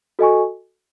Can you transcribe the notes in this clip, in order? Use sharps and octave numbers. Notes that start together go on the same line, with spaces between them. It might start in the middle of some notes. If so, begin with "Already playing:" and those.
F#4 A4 D#5 G#5 C#6